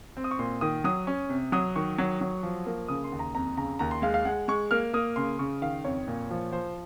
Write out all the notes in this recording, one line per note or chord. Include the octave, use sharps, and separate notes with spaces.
C4
D#6
C#6
A#2 C6
D#3 D#6
F#3 D#6
C#4
C3
F#3 D#6
D#3 C#6
F#3
F#3
F3
A#3
C#3 D#6
C6
D#2
A#5
F2 A#5
C#3 A#5
D#2 A#5
C6
G#3 F5
F5
G#3 F#5
G#3 C#6
A#3 F6
A#3 D#6
C#3 C6
C#3 C#6
D#3 F5
F2 C#5
A#2
F3
F3 C5